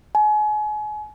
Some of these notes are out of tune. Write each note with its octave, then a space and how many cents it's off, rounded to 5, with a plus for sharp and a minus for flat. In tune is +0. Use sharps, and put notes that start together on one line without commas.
G#5 +35